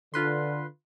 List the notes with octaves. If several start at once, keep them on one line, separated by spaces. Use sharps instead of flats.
D3 F4 B4 C6